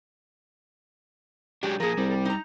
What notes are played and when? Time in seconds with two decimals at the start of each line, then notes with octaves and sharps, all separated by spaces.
1.63 F#3 G#3 D4 G4
1.80 F3 A#3 G#4 A#4
1.97 C2 G3
2.25 D#4 A#5